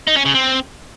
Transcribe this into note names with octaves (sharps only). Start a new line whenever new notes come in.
D#4
C#4
C#3
C4